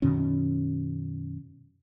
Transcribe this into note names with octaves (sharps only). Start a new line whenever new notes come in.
F#2 B2 D#3 C#4